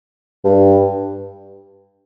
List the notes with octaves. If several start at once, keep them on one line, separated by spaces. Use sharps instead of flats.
G2